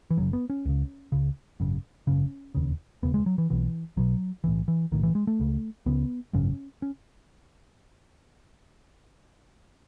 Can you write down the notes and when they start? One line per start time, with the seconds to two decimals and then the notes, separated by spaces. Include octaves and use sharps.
0.10 E3
0.17 F#1 F#2 C#3 F#3
0.33 B3
0.50 C#4
0.66 C#2 C#3
1.12 C#2 C#3
1.60 G#1 F#2 C#3
2.07 G#1 F#2 C#3 C#4
2.55 E1 D#2 C#3
3.03 E1 D#2 C#3 B3
3.14 G#3
3.26 F#3
3.38 E3
3.50 B1 B2 E3
3.97 B1 B2 F#3
4.44 B1 A2 E3
4.68 E3
4.92 B1 A2 D#3
5.03 E3
5.15 G#3
5.27 A3
5.39 C#2 C#3
5.86 C#2 C#3 B3
6.33 G#1 F#2 C#3 C#4
6.82 C#4